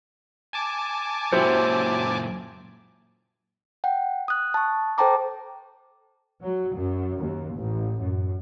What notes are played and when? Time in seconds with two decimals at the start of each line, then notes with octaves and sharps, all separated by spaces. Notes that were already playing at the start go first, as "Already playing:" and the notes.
0.53 G#5 A5 D6
1.32 F#2 A#2 F#3 E4 G4 C5
3.84 F#5 G5
4.28 D#6 F#6
4.54 A5 C#6
4.98 A4 C5 G5 A5 A#5 D6
6.41 F#3
6.75 F#2
7.20 D#2
7.55 A1
8.00 F#2